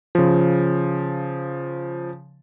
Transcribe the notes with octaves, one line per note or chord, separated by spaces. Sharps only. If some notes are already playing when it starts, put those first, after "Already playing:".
C#3 F3